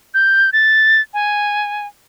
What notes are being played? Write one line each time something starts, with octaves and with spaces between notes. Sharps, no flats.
G6
A6
G#5